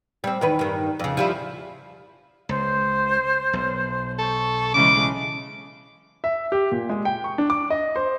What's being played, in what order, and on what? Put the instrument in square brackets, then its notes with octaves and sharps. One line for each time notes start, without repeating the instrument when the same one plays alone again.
[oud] G3 C4
E2 D#3 B4
G2 D#3
F2 C#3
F3 G3 E4
[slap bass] C#2 [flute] C5
[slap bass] B1
[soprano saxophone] A4 [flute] C#6
[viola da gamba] C#3 E3 G#3 [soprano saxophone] D6
[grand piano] E5
G4
A#2
G#3
G5
C#6
D4
D6
D#5
C5